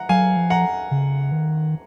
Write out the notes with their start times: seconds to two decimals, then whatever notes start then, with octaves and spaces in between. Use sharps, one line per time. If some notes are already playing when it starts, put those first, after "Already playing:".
Already playing: F#5 A#5
0.09 F#3 F5 G#5
0.36 F3
0.50 F#5 A#5
0.91 C#3
1.32 D#3